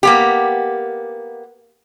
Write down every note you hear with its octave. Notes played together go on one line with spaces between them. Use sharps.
A#3 B3 G4